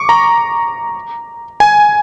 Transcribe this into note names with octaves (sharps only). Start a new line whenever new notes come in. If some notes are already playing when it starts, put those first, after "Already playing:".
Already playing: C#6 D6
A#5
G#5